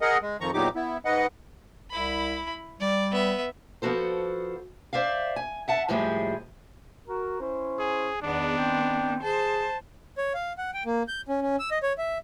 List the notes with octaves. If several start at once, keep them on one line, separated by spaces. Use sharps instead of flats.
G#4 A#4 D#5 F#5
G#3
F2 D#3 F3 A#5 C#6
E2 A#2 F#3 D#4 G4 D6
B3 E4
G#2 B4 D#5 F#5
C2 E4 B5
G3 D5
B3 E5
F3 B3 F#4 A4 C5
C5 D5 E5 F5
G#5
E5 F#5 A5
D#2 A2 F3 G3 G#3 G#4
F#4 A#4
C#4 E4 C5
G#4
E2 D#3 B3 D4
C4 G5
G#4 C5 A5
C#5
F5
F#5
G5
A#3
G6
C#4
C#4
E6
D#5
C#5
E5